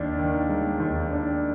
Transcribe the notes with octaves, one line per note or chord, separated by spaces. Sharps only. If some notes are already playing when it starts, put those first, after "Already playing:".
Already playing: D#2 D4
D#3
G#3
D#2
D4